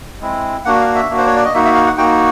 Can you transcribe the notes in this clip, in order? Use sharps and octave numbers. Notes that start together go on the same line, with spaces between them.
G#3 C4 E4
A#3 D4 F#4 F#5
F5
E5
A#3 D4 F#4
C5
C#5
D5
D#5
A#3 D#4 F#4 E5
E5
F5
F#5
A#3 D#4 F#4 G5